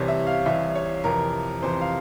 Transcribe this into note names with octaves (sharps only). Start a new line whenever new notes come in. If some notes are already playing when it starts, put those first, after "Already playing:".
Already playing: C2 C3 E3 C#5
E5
F5
C2 C3 E3 E5
C#5
F2 C3 E3 A#4
F2 C3 E3 C5
F5